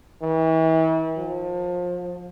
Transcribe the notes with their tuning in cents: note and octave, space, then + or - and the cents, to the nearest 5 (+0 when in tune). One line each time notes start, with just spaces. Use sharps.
E3 -40
F3 +30